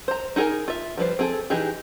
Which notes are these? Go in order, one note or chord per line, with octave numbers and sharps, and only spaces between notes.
C5 A#5
D#4 E4 G#4 A#4 G#5
F4 E5
F3 G3 B4 C5
C4 G#4 A4
E3 D#4 G4 G#4